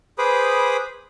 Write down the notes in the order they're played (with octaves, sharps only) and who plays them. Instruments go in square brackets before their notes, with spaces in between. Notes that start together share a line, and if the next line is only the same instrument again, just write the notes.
[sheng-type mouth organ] G#4 B4 C5 B5 D6 D#6